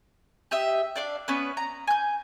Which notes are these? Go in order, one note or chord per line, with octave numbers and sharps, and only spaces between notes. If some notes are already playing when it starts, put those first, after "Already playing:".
G4 D#5 E5
D4 D5 F5
B3 C#4 B4
A#5
G#5 G6